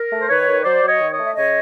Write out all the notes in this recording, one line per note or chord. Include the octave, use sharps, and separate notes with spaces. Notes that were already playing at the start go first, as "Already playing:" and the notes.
Already playing: A#4
A3
C5
D#3 B4 C#5
D#3
F#3 C5 D5
F#3
C#5 D#5
D#3
C#5 D#5
A3
E5
C#3 C#5 D#5